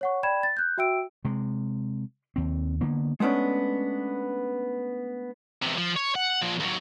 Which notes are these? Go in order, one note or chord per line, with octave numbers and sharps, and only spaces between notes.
C#5 F#5 C#6
D5 G5 B5 G#6 E7
A6
F#6 G6
F#4 E5 G5 E6 D7
C3 G#3
D#2 C4
D3 A#3 B3
G#3 A3 B3 C#4 D4
E2 C3
F3
C#5
F#5
A#2 F3
D#2 F#3